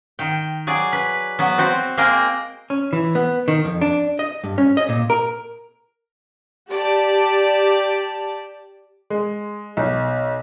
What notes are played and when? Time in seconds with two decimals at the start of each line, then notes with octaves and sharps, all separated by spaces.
0.19 D#3 G5
0.67 F#3 G#4 D5
0.93 B4
1.39 F#3 B3
1.58 C4 F#4 C5
1.97 G#3 A#3 C4 A#4 C5 D#5
2.70 C#4
2.93 E3
3.15 B3
3.48 D#3
3.65 F2
3.81 D4
4.19 D#5
4.44 G2
4.58 C#4
4.77 D#5
4.89 A#2
5.10 A#4
6.71 G4 D5 A5
9.10 G#3
9.77 B1